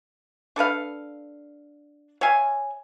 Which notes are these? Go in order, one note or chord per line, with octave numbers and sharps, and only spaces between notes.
D4 A4 B4 F5
C#5 E5 F5 G#5